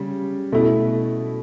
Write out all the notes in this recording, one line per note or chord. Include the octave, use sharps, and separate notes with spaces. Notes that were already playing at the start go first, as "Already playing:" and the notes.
Already playing: C#3 G3
B2 A3 E4